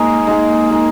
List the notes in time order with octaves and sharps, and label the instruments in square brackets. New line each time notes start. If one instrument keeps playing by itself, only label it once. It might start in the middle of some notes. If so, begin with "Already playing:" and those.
Already playing: [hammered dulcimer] G#3 D#4 G#4 [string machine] A#3
[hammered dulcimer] G#3 D#4 G#4
G#3 D#4 G#4